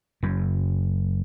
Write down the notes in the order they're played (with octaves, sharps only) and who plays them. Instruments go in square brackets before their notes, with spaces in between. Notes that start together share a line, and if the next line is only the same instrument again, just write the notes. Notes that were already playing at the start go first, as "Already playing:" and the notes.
[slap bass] F#1 F#2